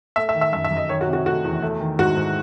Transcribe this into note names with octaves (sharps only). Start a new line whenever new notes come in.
A3 E5
E5
D#3
E5
F#2 E5
E5
F#2
D#5
D#3 C#5
F#4
C3
F#4
A3 F#4
E2
A3
D#3
G#2 F#4
G#2